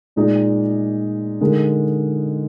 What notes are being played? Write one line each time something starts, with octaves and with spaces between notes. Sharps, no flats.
A#2 G#3 D#4 G#4 D5
D3 G#3 D#4 A#4